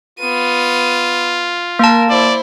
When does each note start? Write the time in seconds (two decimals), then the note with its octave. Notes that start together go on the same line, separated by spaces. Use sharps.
0.19 B3 F4 D#7
1.79 A#3 A#4 A5
2.10 E4 C5 D5